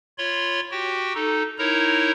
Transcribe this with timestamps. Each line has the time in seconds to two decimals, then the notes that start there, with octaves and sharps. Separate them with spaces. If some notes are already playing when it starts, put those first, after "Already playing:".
0.18 F4 C#5 B5 C6
0.71 F#4 G4 G5
1.15 D#4 A4
1.58 D#4 E4 A#4 C#5 A#5